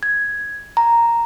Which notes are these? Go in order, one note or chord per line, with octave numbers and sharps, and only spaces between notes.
G#6
A#5